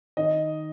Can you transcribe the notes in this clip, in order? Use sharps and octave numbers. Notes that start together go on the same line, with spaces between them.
D#3 D#5